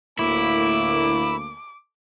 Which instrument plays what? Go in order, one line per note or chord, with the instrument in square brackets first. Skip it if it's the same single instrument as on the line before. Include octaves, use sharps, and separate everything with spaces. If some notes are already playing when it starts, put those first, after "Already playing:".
[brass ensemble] D2 A#3 [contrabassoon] A2 [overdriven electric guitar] E4 [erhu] D6